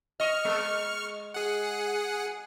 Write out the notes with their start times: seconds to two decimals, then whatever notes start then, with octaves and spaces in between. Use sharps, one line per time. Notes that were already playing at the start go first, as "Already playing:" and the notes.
0.20 D#5 C#6 F6
0.45 G#3
1.34 G#4 F#5